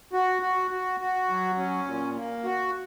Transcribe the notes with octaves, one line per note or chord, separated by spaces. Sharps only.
F#4
F#4
F#4
F#4
F#3
C#4
A#2
A#3
F#4